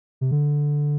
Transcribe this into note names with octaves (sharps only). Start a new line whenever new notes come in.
C3
D3